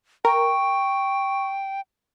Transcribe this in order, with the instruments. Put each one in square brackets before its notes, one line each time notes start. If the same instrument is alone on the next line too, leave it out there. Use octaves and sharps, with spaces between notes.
[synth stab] A#4 [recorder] G5 [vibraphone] C#6